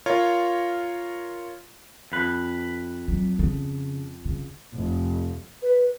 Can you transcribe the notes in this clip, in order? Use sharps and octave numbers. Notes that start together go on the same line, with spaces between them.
F4 A#4 C#5
F2 B4
F#3
C#3
C#3
F1
B4